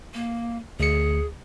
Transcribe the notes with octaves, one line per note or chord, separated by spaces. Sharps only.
A#3
D2 G#4 C#7